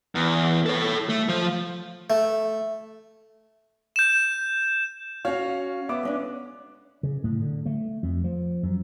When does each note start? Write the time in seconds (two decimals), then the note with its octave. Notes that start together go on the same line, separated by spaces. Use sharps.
0.15 E2
0.66 A4 C#5
1.09 A3
1.29 F3
2.10 A3
3.96 G6 E7
5.25 C#4 F#4 C#5 F5
5.89 B3 E5 D6
6.03 G#3 C#4 D4
7.03 C#3
7.24 A2
7.42 D3
7.66 A3
8.03 F2
8.24 F3
8.63 F#2